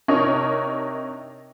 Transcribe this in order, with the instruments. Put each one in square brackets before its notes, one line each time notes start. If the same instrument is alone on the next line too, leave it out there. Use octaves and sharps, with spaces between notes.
[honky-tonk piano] C3 D4 D#4 A#4 C#5